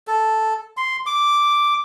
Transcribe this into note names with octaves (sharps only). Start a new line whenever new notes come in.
A4
C6
D6